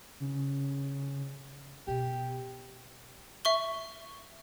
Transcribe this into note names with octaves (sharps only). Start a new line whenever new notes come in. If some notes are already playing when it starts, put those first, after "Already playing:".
C#3
B2 G4
E5 C#6 G7